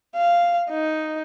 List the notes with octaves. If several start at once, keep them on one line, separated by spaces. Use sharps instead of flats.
F5
D#4